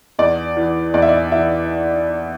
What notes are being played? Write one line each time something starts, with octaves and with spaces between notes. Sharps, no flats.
E2 D5
E3
E2 D5
E5
D5
E3 E5